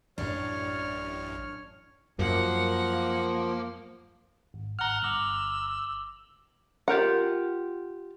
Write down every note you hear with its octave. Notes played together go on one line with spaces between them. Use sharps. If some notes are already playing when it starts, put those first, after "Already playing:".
A1 F#2 A2 D4 C#5 F6
F#2 F3 A#3 F#5
G#1
G#1 F#5 A#5 F6 F7 G7
G1 D6 E6 A#6 F#7
F4 G4 A#4 F#5